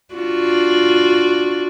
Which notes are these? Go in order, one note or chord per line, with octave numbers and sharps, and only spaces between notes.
D4 F4 F#4